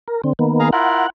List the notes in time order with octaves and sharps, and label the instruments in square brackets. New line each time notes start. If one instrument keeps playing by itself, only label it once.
[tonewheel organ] A#4
D3 C4
D#3 A#3 B3
[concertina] G#4 F5 A#5
[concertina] E4 F4 A#4 [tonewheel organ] F#5